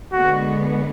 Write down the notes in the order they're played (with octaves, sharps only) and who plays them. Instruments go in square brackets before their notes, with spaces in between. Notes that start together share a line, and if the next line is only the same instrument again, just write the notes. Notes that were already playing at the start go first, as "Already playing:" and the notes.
[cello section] D3 G#3 B3 [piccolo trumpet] F#4